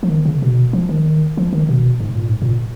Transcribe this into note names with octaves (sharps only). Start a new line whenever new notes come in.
F3
D#3
C#3
B2
F3
D#3
F3
D#3
B2
G#2
A#2
G#2
A#2